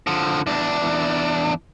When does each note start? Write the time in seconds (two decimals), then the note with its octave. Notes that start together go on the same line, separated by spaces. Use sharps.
0.07 D3 F3
0.46 E2 D4